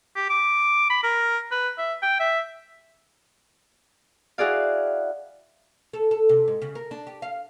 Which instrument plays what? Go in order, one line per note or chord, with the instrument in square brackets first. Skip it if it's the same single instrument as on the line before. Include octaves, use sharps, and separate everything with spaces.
[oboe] G4
D6
B5
A#4
B4
E5
G5
E5
[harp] E4 F#4 G#4 D5 F5
[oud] A4
A4
C3
G#2
C#3
A#4
D4
G4
F5